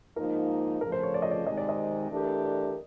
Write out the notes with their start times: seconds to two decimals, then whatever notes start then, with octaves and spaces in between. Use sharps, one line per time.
0.16 G#2 F3 A#3 D#4 A#4
0.81 F2 C#3 F3 A3 A#4
0.92 C5
1.03 C#5
1.14 D5
1.22 D#5
1.31 D5
1.46 C3 D#3 G#3 C4 D#4 D#5
1.57 D5
1.69 D#5
2.11 E3 A3 D4 G4 A#4
2.44 D5